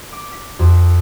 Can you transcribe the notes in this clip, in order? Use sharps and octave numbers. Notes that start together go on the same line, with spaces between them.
D6
B6
F2